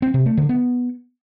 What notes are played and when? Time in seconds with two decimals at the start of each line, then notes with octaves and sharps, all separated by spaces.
0.02 C4
0.14 C3
0.26 A3
0.37 D3
0.49 B3